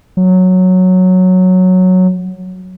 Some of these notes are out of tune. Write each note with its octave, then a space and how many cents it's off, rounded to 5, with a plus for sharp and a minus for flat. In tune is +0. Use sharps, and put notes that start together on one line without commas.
F#3 -5